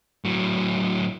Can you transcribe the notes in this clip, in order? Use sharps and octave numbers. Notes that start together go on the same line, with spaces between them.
A2 F#3